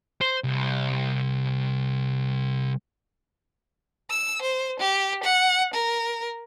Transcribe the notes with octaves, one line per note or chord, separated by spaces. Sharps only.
C5
C2
E6
C5
G4
F#5
A#4